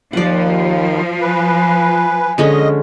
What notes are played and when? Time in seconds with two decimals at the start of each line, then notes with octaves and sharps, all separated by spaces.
0.13 D#2 F3 D5 F#5
1.21 B4 G#5
2.38 D3 G#3 C#4 D#5